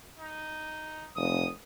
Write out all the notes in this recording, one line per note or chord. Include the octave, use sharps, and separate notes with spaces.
D#4
F1 D#6